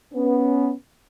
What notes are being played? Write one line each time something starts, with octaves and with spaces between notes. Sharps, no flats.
B3 C#4